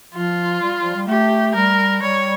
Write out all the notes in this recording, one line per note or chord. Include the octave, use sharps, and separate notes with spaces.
F3 F4
G3
F3
G3
A3 G4
G3 A#4
G3 C#5